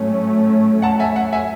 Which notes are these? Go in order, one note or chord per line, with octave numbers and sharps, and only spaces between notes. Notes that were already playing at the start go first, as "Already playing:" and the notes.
Already playing: A2 F#3 A3 C#4
F#5 A5
E5 G#5
F#5
E5 G#5